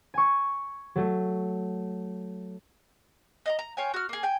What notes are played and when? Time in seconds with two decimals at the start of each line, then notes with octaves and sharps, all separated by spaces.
0.14 G#5 C#6
0.96 F#3 A3
3.46 D#5 F5 A#5
3.59 A#5
3.77 F4 C#5 G5 G#5
3.94 F#4 F6
4.09 A#3 G#4
4.23 G5 G#5